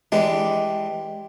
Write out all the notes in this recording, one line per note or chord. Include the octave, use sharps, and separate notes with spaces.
E3 G#3 D4 G4 D#5